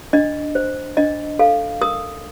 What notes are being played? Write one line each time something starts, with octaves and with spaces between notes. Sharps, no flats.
D4 D#5
C5
D4 D#5
A4 F5
A#4 D#6